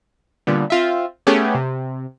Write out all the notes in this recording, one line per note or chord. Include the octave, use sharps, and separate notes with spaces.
A#2 D3 G3 B3
C4 F4 E5
A3 B3 C#4 G4 G#4
C3